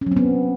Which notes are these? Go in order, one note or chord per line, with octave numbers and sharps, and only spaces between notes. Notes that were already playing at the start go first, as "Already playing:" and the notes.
C#4
F#3
C4
B3